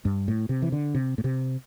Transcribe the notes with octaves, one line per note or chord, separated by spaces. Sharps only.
G2
A2
C3
E3
D3
C3
A2
C3